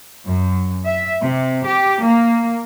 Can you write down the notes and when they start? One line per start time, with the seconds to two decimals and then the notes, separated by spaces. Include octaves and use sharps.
0.25 F#2
0.85 E5
1.22 C3
1.65 G4
2.03 A#3